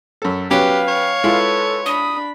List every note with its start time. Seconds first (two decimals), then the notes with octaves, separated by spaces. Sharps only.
0.22 F#2 A4
0.51 F#3 B3 C#4 G4 B4 F5 G5
0.88 C#5
1.24 G#3 E4 F4 A4 B4
1.86 D4 B5 D#6